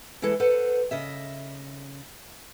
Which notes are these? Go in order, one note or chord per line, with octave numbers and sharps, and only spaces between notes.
E3 G#3 E4 A4
A4 B4 C5 F#5
C#3 D#5 E5